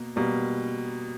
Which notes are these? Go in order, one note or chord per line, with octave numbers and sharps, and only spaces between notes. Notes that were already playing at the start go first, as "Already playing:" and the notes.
Already playing: B2 A#3
B2 G3 A#3